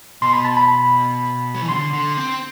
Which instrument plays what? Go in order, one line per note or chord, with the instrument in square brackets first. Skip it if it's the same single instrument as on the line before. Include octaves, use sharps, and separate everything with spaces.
[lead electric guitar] B2 [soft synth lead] C6
[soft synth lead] B5
A5
B5
[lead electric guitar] F#3
E3
[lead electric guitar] D3 [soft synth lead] C6
[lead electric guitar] D3
C4